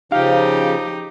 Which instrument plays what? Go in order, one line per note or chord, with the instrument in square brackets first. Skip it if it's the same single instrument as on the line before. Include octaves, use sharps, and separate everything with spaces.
[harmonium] C#3 F3 [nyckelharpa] D#4 [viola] G4 [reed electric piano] F5